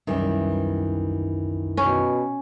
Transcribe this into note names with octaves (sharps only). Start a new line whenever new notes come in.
C2 F#2 D#3 E3 G3
B2 C#4